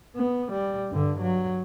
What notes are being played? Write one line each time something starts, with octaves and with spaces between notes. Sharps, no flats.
B3
G3
G2 D3
F#3